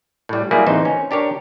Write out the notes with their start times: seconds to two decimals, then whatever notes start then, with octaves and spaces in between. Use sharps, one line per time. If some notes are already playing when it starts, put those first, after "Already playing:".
0.29 A2 G3
0.51 F#3 G3 A#3 E4 G#4
0.67 A1 D#2 E3 C4 D#4 C5
0.85 C#4
1.11 D4 G4 A#4 C#5